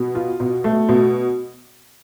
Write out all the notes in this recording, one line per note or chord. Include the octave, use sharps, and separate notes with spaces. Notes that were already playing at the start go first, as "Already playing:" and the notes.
Already playing: B2
F4
B2
A3
B2